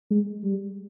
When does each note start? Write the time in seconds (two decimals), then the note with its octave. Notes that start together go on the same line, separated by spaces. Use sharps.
0.11 G#3
0.44 G3